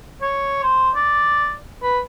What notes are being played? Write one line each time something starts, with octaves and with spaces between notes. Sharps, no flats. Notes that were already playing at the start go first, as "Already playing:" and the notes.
C#5
C5
D5
B4